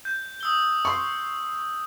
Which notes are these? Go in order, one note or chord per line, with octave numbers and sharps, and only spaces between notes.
G6
D#6 E6 G7
C6 C#6